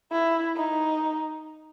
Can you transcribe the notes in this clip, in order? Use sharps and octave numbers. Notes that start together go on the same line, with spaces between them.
E4
D#4